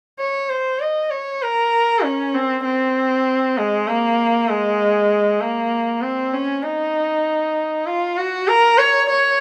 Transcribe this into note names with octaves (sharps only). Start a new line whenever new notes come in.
C#5
C5
D#5
C#5
A#4
C#4
C4
C4
G#3
A#3
G#3
A#3
C4
C#4
D#4
F4
F#4
A#4
C#5
C#5